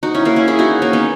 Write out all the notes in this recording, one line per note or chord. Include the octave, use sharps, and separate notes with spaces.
D#4 F#4
C#4 E4
A#3 C#4
C#4 E4
E4 G#4
D#4 F#4
A#3 C#4
B3 D#4